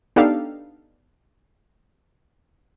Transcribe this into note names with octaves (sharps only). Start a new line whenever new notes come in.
B3 D4 D#4 G4 A4 F5